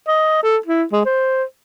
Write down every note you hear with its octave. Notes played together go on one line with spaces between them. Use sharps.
D#5
A4
E4
G#3
C5